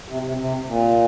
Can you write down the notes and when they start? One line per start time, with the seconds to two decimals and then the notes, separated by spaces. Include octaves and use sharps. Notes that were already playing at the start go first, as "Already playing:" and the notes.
0.08 C3
0.22 C3
0.37 C3
0.68 A#2